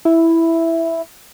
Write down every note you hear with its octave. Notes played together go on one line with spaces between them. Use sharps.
E4